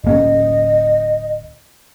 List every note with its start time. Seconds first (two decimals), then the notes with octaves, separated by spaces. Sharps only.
0.04 D1 A#3 C#4 D#5